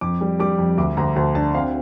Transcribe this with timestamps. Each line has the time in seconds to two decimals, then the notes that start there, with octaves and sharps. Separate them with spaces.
0.01 F2 D6
0.21 G3
0.40 G3 D6
0.58 F2
0.77 D2 D6
0.97 D2 A#5
1.16 D2 A5
1.35 D4 A5
1.55 C4 F5